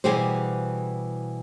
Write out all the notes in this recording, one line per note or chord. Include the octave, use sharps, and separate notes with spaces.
B2 E3 G3 G4 G#4 C5